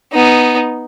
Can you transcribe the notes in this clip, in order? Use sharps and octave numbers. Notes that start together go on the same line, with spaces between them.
B3 D#4